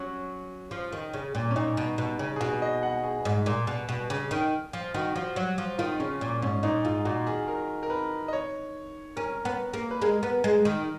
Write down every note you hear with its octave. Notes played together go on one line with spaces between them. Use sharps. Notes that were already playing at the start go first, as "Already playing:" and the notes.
Already playing: F#3 C#4
F3
D#3
C#3
A#2
C#4
A#2 D#4
B2
B2
C#3
G#4
B2 F#4
D#5
F#5
G#4
G#2
A#2
B2
B2
C#3
D#3
F3
D#3 F#4
F3
F#3
F3
D#3 F4
C#3 C#4
A#2
G#2 C#4
A#2 D#4
G#2 F4
A#2 F#4
D#3 G#4
A#4
A#4
B4
D#5
C#5
C#4 A#4
B3
A#3
B4
G#3 A#4
B3
G#3
D#3